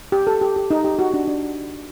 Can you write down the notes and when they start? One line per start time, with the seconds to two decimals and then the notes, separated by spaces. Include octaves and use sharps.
0.12 G4
0.27 A4
0.42 G4
0.56 G4
0.71 D#4
0.84 G4
0.99 F#4
1.14 D4
1.28 D4